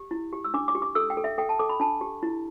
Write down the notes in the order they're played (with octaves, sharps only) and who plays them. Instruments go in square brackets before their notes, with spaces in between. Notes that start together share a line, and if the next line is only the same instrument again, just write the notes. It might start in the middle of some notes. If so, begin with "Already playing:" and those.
Already playing: [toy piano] G4
E4
G4
E6
D4 D6
D6
G4
D6
A4 E6
G5
A4
E5
A4 G5
A5
A4 D6
B5
D4 A5
G4
E4